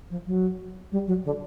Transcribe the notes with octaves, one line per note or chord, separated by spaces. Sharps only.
F3
F#3
G3
F#3
D3